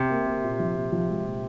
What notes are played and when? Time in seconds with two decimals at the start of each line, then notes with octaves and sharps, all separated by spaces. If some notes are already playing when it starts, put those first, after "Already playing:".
Already playing: C3
0.10 A#3
0.26 A#3
0.44 A#2
0.59 F3
0.76 A#2
0.92 F3
1.09 G#3
1.25 A#2